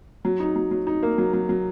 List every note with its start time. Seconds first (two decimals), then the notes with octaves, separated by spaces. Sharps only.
0.25 F#3
0.40 D#4
0.56 F#3
0.71 F#3
0.87 D#4
1.03 A#3
1.18 F#3
1.33 F#3
1.49 F#3